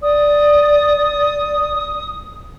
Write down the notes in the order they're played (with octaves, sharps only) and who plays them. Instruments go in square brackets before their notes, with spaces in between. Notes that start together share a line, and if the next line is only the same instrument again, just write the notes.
[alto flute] D5 [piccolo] D#6